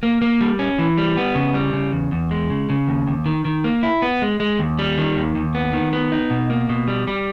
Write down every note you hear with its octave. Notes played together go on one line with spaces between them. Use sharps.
A#3
A#3
G3
C#4
E3
G3
B3
C#3
G3
C#3
E2
E2
G#3
C#3
C#3
D#2
D#2
D#3
D#3
A#3
E4
B3
G#3
G#3
D#2
G3
D#3
D#2
D#2
B3
D#3
B3
D#4
B2
A#3
B2
G3
G3